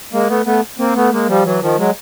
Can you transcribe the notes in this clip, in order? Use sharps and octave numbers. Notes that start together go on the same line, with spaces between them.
G#3 A#3
A3 B3
A3 B3
A#3 C4
A3 B3
G#3 A#3
F3 G3
E3 F#3
D#3 F3
F#3 G#3